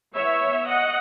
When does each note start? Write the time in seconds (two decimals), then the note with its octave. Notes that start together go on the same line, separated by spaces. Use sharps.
0.15 E3 B3 C#5 E5
0.67 D#5 F#5